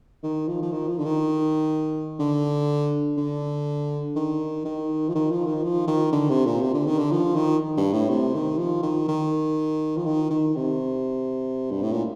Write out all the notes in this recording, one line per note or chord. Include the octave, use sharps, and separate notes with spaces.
D#3
F3
F3
D#3
F3
D3
D#3
D3
D3
D#3
D#3
F3
D#3
F3
D#3
F3
D#3
D3
C3
A#2
C3
D3
D#3
D3
F3
D#3
G2
A2
C3
D#3
F3
D#3
D#3
F3
D#3
D#3
C3
G2
A2
A#2